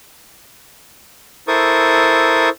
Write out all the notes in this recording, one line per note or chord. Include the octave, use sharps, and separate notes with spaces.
E4 A4 A#4 C5 C#6 D#6